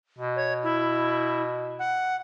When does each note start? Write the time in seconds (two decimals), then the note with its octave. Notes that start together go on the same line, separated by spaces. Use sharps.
0.18 B2
0.36 C#5
0.63 E4
1.79 F#5